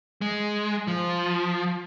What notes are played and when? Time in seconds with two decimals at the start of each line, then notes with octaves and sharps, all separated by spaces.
0.21 G#3
0.88 F3